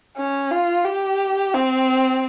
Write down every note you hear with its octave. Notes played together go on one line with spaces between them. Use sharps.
C#4
F4
G4
C4